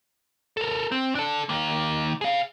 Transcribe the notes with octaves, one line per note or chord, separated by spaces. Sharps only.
A4 A#4
C4
D4 A4
D#3 A#3
G#4 F5